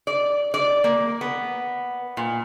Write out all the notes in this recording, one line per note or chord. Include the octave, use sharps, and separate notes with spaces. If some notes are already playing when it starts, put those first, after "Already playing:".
D5
D5
A#3
B3
A#2